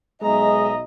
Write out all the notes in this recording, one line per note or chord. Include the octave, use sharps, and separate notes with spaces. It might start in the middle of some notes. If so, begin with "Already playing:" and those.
B1 G#3 D#5 E5 A#5